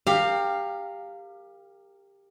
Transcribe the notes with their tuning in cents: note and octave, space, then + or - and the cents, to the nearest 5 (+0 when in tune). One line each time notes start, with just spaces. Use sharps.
G4 +20 A#4 -25 F5 +0